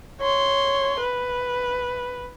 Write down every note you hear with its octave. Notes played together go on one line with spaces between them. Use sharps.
C#5 C6
B4